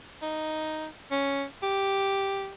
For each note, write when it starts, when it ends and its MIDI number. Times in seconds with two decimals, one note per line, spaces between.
0.22 0.87 63
1.11 1.45 61
1.63 2.54 67